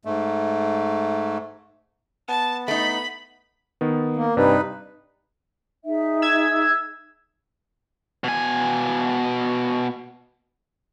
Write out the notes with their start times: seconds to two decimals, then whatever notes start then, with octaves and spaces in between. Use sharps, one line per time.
0.05 G#2 A3
2.29 B3 A5
2.68 A3 D#4 B5
3.81 D#3 B3
4.17 A#3
4.37 G2 C3 D#4 B4
5.85 D#4 G#4 E5
6.22 E6 G#6
8.24 B2 G#5